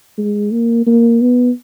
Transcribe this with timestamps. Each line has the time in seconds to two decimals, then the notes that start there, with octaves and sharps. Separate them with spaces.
0.18 G#3
0.52 A#3
0.87 A#3
1.21 B3